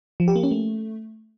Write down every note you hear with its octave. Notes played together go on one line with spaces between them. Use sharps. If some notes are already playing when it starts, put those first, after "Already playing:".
F3
G4
A#3
C#4
A3